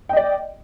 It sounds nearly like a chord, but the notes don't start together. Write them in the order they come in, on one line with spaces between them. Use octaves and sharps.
G5 D#5 D5